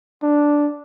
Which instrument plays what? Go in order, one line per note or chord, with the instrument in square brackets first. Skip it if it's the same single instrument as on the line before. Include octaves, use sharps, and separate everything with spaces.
[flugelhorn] D4